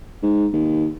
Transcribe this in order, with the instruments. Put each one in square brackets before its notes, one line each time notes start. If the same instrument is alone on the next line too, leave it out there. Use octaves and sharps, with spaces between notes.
[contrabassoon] G#2
D#2